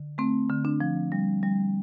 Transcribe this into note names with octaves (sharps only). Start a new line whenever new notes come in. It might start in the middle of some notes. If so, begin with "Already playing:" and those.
Already playing: D3
A3 C4
D3
D4
F3
G3
G3